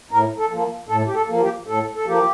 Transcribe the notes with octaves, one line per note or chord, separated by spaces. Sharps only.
A2 A#4
A4
F3 A#3
A2 A4
G4
A4
F3 A#3
G4
A2 A4
A4
F3 A#3 G4